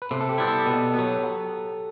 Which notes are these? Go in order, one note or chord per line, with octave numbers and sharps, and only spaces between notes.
B4
C3 A4
A4
G4
G3 B3 E4
A4
B2
F#3 B3